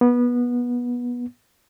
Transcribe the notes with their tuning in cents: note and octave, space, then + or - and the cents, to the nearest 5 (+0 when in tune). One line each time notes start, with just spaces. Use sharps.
B3 -20